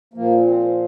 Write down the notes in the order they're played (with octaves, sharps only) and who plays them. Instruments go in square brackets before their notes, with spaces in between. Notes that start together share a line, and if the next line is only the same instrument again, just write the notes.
[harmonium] A#2 F3 A#3
C4